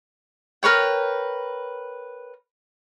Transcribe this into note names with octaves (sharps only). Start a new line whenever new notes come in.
A#4 B4 C#5 G5